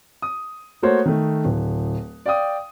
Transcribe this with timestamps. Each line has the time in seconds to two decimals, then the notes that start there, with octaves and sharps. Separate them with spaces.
0.22 D#6
0.83 A3 A#3 F#4 C5 C#5 F#6
1.06 D#3 A3
1.45 D1
2.26 D5 F5 G5 D#6